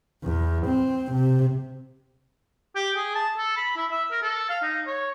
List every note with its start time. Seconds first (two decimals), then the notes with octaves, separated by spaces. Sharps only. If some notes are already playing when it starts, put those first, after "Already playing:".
0.23 E2
0.66 C4
1.12 C3
2.75 G4
2.95 G#4
3.15 A5
3.38 A4
3.57 B5
3.76 E4
3.91 E5
4.11 A#4
4.22 A4
4.49 F5
4.62 D#4
4.86 C#5